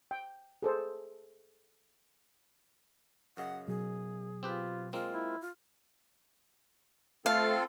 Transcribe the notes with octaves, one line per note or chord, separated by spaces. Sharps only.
G5
G#4 A4 C5
F#2 C#3 D#5 F#5
B2 F#3 G#4
C4 F4 G4 B4
G#3 A#3 C4 F4
E4
F4
A3 C4 F4 A4 F5